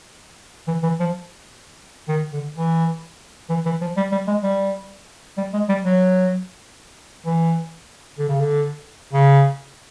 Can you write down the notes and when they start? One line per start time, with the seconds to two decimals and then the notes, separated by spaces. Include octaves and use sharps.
0.68 E3
0.83 E3
1.00 F3
2.08 D#3
2.33 D3
2.56 E3
3.50 E3
3.66 E3
3.81 F3
3.97 G3
4.12 G3
4.27 G#3
4.44 G3
5.37 G3
5.54 G#3
5.69 G3
5.84 F#3
7.26 E3
8.18 D3
8.29 C#3
8.40 D3
9.13 C#3